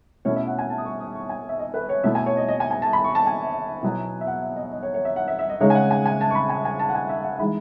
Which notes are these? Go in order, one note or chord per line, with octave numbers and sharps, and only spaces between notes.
B2 A3 C#4 E4 C#5
E5
F#5
G#5
A5
D#6
C#6
D#6
C#6
G#5
E5
D#5
B4
C#5
B2 A3 E4 E5
G#5
C#5
D#5
D#5
G#5
G#5
A5
B5
C#6
A5
G#5
B2 F#3 B3 E4
E5
F#5
E5
D#5
D#5
C#5
C#5
E5
F#5
E5
E5
D#5
C#3 G#3 D#4 C#5
G#5
F#5
G#5
G#5
A5
C#6
B5
G#5
G#5
A5
F#5
G#5
E5
F#5
E3 G#3 D#4 B5